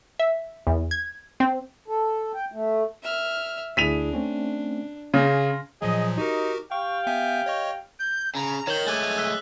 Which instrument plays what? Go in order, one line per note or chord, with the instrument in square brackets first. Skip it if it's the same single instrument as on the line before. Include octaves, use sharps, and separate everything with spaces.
[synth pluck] E5
E2
G#6
C4
[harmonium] A4
G5
A3
[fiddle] E5 F6
[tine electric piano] D2 E4 G#4 [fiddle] D4 [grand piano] B6 D#7 F7
[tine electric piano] A3 C4 C#4
[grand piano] C#3 [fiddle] G#4 [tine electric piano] C6 F6 A#6
[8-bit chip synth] A#2 F3 F#3 [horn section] G#4 D#5
[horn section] D#4 [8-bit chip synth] F#4 G4 A#4
[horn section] G4 F5 G5 [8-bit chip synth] C#6
[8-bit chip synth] B3 E5 G#5
C#5 D#5 C#6
[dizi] G6
[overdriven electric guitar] C#3 [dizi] A#5
[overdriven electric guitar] D#3 [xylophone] C#5 G6 [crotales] E7 F#7 G7
[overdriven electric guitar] G#3 A3 [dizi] G#5 [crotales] D6 F#6 A6
[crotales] E6 F#6 B6